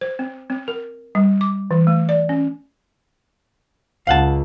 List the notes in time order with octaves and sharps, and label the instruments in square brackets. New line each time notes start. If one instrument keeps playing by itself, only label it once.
[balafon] C5
C4
C4
A#4
G3
D6
E3
A3
D5
C#4
[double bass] C#2 [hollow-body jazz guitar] F5 F#5 A5